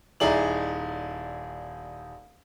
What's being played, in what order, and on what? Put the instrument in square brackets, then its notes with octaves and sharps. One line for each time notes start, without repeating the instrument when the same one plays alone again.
[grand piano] D#1 D#4 E4 G#4 D5 F#7